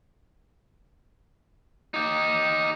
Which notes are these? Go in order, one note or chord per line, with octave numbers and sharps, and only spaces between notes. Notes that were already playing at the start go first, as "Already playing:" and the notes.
D#4 G4